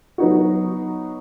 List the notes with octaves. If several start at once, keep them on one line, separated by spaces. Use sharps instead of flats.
F#3 B3 D#4 F#4